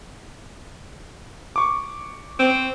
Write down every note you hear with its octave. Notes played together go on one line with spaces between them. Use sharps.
C#6 D6
C4